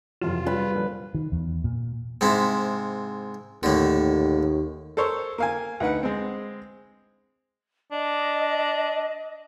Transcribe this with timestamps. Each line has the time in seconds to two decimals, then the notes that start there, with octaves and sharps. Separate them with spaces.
0.22 F2 C3 E3 F#3 F4 E7
0.46 G3 B4 C#5
0.75 A#2 D3 F3
1.14 D#3
1.32 E2
1.64 A#2
2.21 G#2 C3 E4
3.63 D#2 A2 D3
4.97 A4 A#4 C5 C#5
5.38 A#3 F5 G#5
5.80 D2 D#4 B4 F#5
6.03 G#3 C4
7.92 D4 D#5